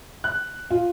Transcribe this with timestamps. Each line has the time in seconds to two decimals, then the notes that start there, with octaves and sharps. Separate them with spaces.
0.24 F#6
0.71 F4